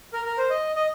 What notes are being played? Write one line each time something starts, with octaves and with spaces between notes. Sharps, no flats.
A#4
A#4
C5
D#5
D#5